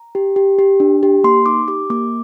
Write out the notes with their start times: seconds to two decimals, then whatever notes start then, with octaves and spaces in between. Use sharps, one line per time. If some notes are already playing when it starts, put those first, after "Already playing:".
Already playing: A#5
0.15 G4
0.36 G4
0.59 G4
0.80 D4
1.03 G4
1.24 A#3 C6
1.46 D#4 D6
1.68 G4 D6
1.90 A#3 D6